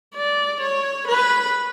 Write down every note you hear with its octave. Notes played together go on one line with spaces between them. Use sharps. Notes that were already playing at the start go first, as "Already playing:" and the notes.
D5
C#5
B4